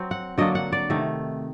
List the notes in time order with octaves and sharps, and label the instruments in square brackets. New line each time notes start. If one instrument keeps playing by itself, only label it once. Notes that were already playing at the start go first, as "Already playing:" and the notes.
Already playing: [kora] F#3 C4
F#5
D3 F#3 A#3 D4 D#5
F#5
D5
C3 D#3 A3